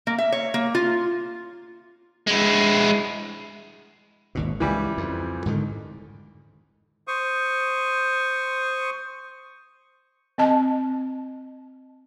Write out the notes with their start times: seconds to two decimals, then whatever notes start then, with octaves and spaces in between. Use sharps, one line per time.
0.07 A#3
0.18 E5
0.32 C#5
0.54 A#3
0.75 F4
2.27 G#3 E4
4.35 G#1 D#2 B2
4.60 C#2 E3 G3
4.98 F2
5.46 G#2 D3 D#3
7.08 C5 C#6 D#6
10.38 C4 D#5 A5